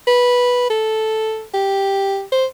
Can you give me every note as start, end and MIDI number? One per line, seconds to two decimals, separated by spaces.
0.07 0.65 71
0.70 1.43 69
1.54 2.22 67
2.32 2.46 72